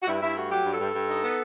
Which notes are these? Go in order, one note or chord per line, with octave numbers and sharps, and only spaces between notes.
F#4
G2 E4
G2 E4
A3 F#4
F#3 G4
G2
A4
G2
G2
D#4
B3